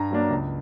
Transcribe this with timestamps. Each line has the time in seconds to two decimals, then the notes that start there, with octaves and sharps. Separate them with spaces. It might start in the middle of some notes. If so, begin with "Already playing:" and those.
Already playing: G2 A#5
0.11 F#3 A#3 D4
0.30 C#2